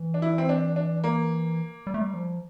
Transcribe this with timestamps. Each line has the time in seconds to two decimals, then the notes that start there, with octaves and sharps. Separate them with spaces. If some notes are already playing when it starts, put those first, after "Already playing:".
Already playing: E3
0.14 D4
0.22 E4
0.38 C4
0.49 D4
0.76 D4
1.04 A#3
1.87 G3
1.94 A3
2.01 G3
2.14 F3